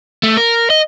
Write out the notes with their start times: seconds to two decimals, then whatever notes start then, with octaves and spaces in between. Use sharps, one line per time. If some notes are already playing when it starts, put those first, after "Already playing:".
0.23 A3
0.37 A#4
0.70 D#5